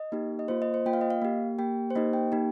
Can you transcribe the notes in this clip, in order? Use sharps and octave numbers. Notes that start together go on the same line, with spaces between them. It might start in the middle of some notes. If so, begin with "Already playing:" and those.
Already playing: D#5
A#3 D#4 G4
D#5
A#3 F4 C5
D#5
C5
A#3 F4 G5
F5
D#5
F5
A#3 G4
A#3 G4 G5
C5
A#3 D#4 G4 D#5
G5
A#3 D#4 G4